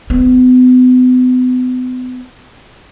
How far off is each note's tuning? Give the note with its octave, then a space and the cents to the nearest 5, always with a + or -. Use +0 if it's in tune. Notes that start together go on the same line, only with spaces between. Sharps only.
B3 +40